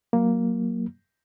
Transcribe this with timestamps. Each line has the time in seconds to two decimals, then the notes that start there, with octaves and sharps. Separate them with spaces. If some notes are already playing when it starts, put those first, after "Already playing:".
0.13 F#3 A#3